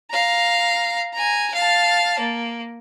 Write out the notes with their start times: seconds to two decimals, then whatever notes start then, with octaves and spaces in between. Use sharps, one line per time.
0.11 F5 A#5
1.13 G#5 A#5
1.54 F5 A5
2.19 A#3